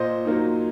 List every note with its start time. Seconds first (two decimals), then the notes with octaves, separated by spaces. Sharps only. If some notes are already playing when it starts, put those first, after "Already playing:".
Already playing: A#2 C5 D#5
0.25 F#3 A#3 D#4